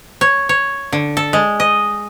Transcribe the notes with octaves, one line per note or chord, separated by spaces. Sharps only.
C#5
C#5
D3
A4
G#3
D#5